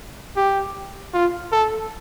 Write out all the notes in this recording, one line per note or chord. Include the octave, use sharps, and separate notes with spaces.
G4
F4
A4